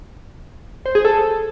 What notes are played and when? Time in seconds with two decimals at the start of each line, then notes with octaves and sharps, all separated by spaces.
0.86 C5
0.95 G#4
1.05 A4